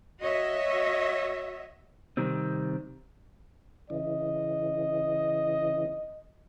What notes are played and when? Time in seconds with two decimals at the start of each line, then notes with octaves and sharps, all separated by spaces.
0.21 F#4 C#5 D#5 E5
2.17 C3 D#3 G3 C4
3.90 C#3 E3 D#5